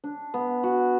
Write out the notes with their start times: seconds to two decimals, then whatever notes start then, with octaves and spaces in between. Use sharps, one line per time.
0.04 D4
0.34 B3
0.63 F#4